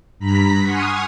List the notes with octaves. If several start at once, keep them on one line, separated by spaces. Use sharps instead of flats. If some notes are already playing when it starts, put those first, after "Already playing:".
G2 A#5 B5 B6
F#5 G#5 C6 C#6 D#6 F6